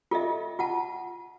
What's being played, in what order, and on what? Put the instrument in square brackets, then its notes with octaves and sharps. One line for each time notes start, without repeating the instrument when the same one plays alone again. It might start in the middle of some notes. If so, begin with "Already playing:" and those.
[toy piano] F4 A4 D#5 E5
F4 F#5 A5